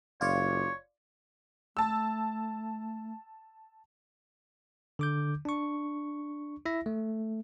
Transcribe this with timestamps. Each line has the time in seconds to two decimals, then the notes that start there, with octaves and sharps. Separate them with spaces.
0.21 F#1 F4 C#5 D5
1.77 A3 A5 E6
4.99 D3 D6 G6
5.45 D4 C#6
6.66 E4 E5 A#6
6.86 A3